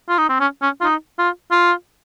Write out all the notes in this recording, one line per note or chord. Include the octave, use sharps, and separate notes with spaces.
F4
D#4
C4
C#4
C#4
F4
D#4
F4
F4